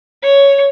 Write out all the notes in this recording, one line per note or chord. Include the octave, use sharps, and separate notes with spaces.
C#5